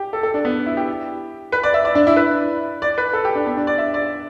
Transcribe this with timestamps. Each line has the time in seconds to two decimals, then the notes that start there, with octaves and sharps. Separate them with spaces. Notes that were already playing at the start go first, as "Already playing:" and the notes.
Already playing: G4
0.13 A4
0.23 A4
0.34 D4
0.45 B3
0.66 E4
0.77 G4
1.52 B4
1.63 D5
1.74 E5
1.85 D5
1.95 D4
2.07 E4
2.16 B4
2.82 D5
2.98 B4
3.13 A4
3.25 G4
3.35 D4
3.46 B3
3.57 D4
3.67 D5
3.78 E5
3.94 D5